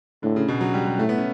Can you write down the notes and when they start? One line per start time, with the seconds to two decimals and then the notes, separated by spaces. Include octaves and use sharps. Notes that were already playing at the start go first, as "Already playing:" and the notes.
0.23 A2 D3
0.36 C#3
0.48 B2
0.61 F#3
0.74 G3
0.86 G3
0.99 A2 A3
1.09 B3
1.18 C#4